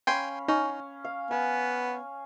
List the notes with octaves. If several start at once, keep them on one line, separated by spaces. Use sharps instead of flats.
C#4 F5 G5 G#5 B5 C6
C#4 D#4
F5
B3 G#5